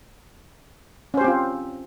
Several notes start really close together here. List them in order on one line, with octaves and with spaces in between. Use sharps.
C#4 C5 G4 C4 F4